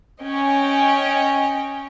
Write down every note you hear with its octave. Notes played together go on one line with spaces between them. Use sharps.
C#4 D#5 G5